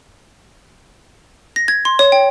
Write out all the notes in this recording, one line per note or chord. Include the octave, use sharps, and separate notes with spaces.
A#6
G#6
C6
C#5
G5